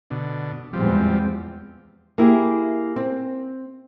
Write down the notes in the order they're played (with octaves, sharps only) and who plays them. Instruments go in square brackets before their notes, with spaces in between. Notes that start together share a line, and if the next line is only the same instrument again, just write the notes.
[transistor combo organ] B2 D3
[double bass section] E2 G#3 C4 [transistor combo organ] F3 G3
[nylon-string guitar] A#3 E4 G4 G#4
C4